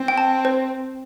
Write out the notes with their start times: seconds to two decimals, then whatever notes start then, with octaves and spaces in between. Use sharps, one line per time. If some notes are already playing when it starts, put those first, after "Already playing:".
Already playing: C4
0.08 G5
0.18 A5
0.45 C5